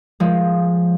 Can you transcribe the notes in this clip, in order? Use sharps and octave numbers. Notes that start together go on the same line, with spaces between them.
F3 G#3